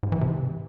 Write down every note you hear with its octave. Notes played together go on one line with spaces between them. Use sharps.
G#2
E3
C3